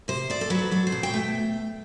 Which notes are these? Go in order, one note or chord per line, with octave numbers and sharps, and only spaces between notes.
C3 C5
D2 D5
A4
F#3 B4
F#3 A4
C5
B2
G5
A3